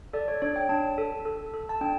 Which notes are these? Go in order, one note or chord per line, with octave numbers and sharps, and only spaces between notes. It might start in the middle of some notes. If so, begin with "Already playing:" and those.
A4 D5
C#5
D4 C#5
G5
D4 A5
A4
A4
A4
A5
D4 G5